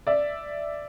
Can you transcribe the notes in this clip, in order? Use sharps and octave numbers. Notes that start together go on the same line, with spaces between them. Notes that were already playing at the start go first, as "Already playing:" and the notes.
D5 E5